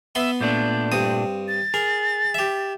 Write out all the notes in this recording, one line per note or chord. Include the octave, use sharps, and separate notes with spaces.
B3 E5 B5 C6
A#2 A3 D4 G6
G2 C4 D#6
A6
G#4 A#4
G4 E5